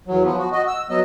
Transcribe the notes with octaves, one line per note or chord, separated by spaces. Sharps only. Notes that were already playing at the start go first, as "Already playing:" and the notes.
E2 F#3
F3 B3
F#4
F#4 D#5
E6
F#3 B3 D#5